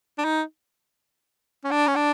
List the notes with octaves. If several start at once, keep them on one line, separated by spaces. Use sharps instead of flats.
D4
D#4
C#4
D4
C#4
D4